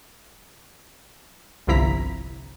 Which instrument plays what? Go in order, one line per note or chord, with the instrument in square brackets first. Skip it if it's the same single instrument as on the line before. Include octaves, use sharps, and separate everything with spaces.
[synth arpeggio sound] G1 C2 F3 E4 A#5 B6